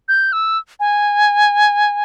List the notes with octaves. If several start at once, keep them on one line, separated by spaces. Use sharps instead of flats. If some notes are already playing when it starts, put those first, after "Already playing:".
G6
E6
G#5